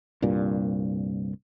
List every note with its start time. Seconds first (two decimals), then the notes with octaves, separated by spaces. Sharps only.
0.22 C2 G2 A#2